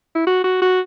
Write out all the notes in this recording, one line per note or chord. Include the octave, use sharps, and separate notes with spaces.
E4
F#4
F#4
F#4